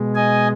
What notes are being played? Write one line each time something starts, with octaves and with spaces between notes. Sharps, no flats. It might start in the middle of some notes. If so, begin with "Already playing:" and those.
Already playing: B2 G#3
D#5 G#5